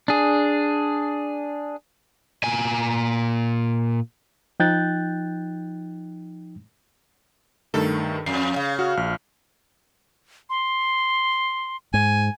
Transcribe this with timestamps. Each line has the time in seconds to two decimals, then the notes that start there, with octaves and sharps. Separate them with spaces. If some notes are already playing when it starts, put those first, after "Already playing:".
0.08 D4 G#4
2.44 A#2 G#5
4.60 F3 D#4 G5 F#6 G6 A6
7.74 G2 D#3 A3 A4
8.26 F2 C7
8.56 C#3 F5
8.79 F#4 F6
8.97 A#1 F6
10.50 C6
11.94 G#2 G#5